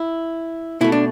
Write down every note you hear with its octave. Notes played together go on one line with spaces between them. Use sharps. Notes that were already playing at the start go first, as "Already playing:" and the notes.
Already playing: E4
B2 A3 E4
D4